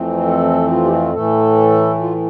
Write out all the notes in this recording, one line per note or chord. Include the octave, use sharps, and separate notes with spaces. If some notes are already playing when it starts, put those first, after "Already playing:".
Already playing: F2 E3 A3 C4
A4
F4
G4
F4
A2 E3 A3 A4
F4